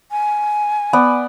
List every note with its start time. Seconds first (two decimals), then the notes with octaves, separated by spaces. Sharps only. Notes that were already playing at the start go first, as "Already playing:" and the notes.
0.11 G#5
0.93 B3 D5